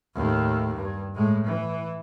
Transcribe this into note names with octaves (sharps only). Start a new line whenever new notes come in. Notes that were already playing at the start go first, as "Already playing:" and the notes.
D#2 A2
G2
A2 G#3
E3